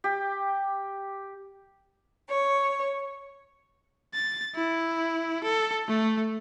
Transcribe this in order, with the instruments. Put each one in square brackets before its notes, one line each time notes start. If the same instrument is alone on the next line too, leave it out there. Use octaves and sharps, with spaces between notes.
[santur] G4
[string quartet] C#5
[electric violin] A6
E4
A4
A3